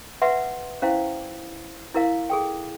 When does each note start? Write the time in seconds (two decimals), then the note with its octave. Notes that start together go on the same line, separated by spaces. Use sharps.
0.22 B4 E5 F#5 C6
0.82 C#4 E4 C5 F5
1.94 E4 A#4 F5
2.30 G#4 A4 G5